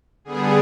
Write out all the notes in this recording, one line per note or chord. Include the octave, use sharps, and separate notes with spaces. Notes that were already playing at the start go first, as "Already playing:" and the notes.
D3 G3 B3 G#4